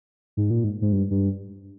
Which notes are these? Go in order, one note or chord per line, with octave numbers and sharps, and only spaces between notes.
G#2
A#2
G#2
G#2
G2
G2